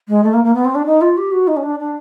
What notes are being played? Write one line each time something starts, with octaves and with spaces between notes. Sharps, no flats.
G#3
A3
A#3
A#3
B3
C4
D4
D#4
F4
G4
F#4
D#4
C#4
D4
D4